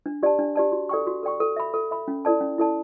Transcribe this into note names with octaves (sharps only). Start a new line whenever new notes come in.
D4
G4 D5 A5
D4
G4 D5 A5
F#4
A4 D5 G5 C#6
F#4
A4 D5 G5 C#6
A4
E5 B5
A4
E5 B5
C#4
E4 A4 D5 A5
C#4
E4 A4 D5 A5